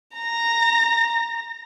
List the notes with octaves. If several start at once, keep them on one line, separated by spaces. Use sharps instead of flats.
A#5 A#6